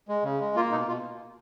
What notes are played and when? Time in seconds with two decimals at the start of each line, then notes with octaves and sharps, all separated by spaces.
0.08 G#3
0.24 C#3
0.40 G#3
0.55 A#3 F4
0.71 B2 D#4
0.88 B2 F4